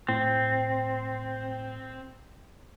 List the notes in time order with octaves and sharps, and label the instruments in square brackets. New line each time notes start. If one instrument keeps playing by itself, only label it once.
[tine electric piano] A2 [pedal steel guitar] C4